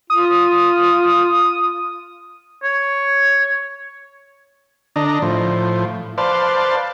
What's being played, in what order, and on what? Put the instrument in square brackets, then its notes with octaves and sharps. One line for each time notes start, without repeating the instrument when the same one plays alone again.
[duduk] F4 [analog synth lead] D#6
[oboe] C#5
[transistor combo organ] D3 D4 D#5 A#5
A2 F3
B4 C5 D5 F5 A5